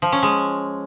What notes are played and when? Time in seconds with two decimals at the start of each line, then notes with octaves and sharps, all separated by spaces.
0.02 F3
0.12 C#4
0.23 G#3